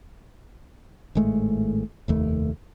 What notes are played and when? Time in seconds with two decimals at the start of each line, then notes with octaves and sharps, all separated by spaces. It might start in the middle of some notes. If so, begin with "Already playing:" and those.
1.15 G#1 A2 G#3 A3
2.08 F1 D#2 A3